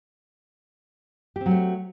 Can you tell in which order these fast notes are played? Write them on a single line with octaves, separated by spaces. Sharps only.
G4 C4 F#3 A3